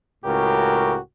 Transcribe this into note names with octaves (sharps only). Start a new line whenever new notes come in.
C#2 A2 C#3 F#4 G4 A#4